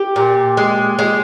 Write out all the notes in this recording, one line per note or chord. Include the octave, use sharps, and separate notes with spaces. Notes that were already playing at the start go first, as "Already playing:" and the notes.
Already playing: G4
A#2
G#3
G#3